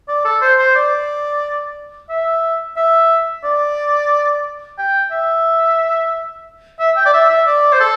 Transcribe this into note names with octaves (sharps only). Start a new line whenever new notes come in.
D5
A4
C5
C5
D5
E5
E5
D5
G5
E5
E5
G5
D5
E5
E5
D5
C5
A4